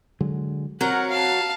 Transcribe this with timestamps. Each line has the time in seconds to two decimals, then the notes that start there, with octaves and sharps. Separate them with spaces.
0.21 D3 F#3 G#3
0.81 F#3 C4 A#4 F#5
1.10 F5 A5